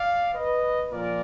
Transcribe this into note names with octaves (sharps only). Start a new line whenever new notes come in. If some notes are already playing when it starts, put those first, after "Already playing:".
Already playing: D5 F5
B4 D#5
A#2 F3 A#4 D5